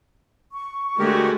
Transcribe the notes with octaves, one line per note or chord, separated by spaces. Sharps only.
C#6
D3 G#3 A3 F#4 G4 A#4